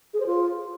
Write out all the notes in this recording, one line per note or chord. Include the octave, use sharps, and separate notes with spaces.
G#4
C5
F4